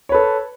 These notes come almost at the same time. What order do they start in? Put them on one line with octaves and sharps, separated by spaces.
C#5 B4 A4